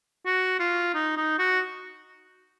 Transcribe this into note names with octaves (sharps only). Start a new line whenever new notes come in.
F#4
F4
D#4
D#4
F#4